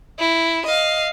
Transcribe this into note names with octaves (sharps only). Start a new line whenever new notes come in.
E4
D#5 F5